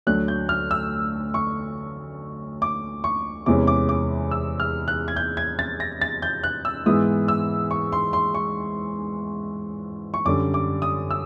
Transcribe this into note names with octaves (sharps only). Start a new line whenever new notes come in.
D2 D3 F#3 F#6
G6
F6
E6
C#6
D6
C#6
E2 C3 E3 G#3 C#4 D6
D6
D6
E6
F6
F#6
G#6
G6
G#6
A6
A#6
A6
G6
F#6
E6
G#2 E3 G#3 B3 E4 D#6
E6
C#6
C6
C6
C#6
C#6
F#2 D3 G3 D6
D6
D#6
E6